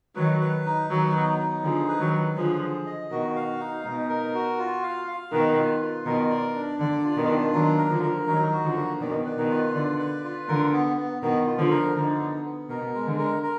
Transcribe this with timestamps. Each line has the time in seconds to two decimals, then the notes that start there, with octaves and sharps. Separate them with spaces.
0.16 D#3 F#3 B4
0.41 B4
0.66 D#4
0.90 D#3 F#3 D#4
1.15 B3
1.39 D#4
1.63 D3 F3 G#4
1.88 B4
2.00 D#3 F#3
2.13 B4
2.37 D3 F3 G#4
2.62 G#4
2.86 D#5
3.10 B2 D#3 F#4
3.36 F5
3.60 D#4
3.84 B2 D#4
4.09 A#4
4.34 F#4
4.59 F4
4.83 F5
5.08 F5
5.32 B2 D#3 B4
5.56 F4
5.82 F4
6.06 B2 D#3 A#4
6.30 D5
6.55 D4
6.80 D3 D5
7.04 F4
7.16 B2 D#3
7.29 D4
7.53 D#3 F#3 A#3
7.78 A#4
7.90 D3 F3
8.02 A#4
8.27 D#3 F#3 D#4
8.52 F#4
8.63 D3 F3
8.76 A#3
9.00 B2 D#3 D5
9.25 B4
9.38 B2 D#3
9.50 F4
9.74 D3 D5
9.99 B4
10.24 F4
10.48 D3 A#4
10.73 B3
10.97 B3
11.22 B2 D#3 B3
11.47 F4
11.58 D3 F3
11.71 A#4
11.96 D3 D#4
12.20 B3
12.45 B3
12.69 B2 A#4
12.94 G#3
13.06 D3
13.18 A#4
13.43 A#4